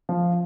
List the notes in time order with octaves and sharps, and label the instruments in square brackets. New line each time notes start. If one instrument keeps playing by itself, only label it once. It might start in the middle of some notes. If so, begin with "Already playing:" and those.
[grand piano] F3